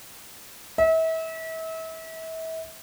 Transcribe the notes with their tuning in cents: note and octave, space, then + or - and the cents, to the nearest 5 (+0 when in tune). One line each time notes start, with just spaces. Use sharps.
E5 -35